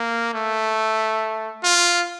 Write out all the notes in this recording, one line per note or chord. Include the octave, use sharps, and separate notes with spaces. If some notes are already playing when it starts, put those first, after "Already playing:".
Already playing: A#3
A3
F4